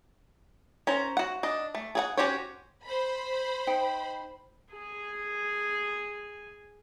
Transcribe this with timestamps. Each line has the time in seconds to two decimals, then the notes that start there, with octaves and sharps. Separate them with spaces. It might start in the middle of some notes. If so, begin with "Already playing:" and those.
0.87 C#4 A#4 C5
1.17 F#4 F#5
1.43 D4 D#5
1.75 A3
1.95 G#4 A4 F#5
2.17 C#4 F#4 G4 C5 C#5
2.85 C5 B5
3.67 D#4 G5
4.72 G#4 G#5